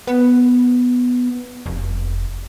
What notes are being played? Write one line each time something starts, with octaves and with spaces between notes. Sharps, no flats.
B3
F1